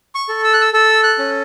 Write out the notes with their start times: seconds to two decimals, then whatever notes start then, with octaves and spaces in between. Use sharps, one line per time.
0.15 C#6
0.29 A4
0.44 E6
0.53 F#6
0.61 E6
0.73 A4 E6
1.03 F#6
1.18 C#4